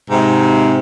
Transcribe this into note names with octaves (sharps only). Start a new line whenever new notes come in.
G#2 C3